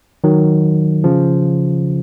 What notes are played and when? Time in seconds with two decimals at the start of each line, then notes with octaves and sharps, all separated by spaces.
0.24 D#3 F#3
1.04 C#3 F3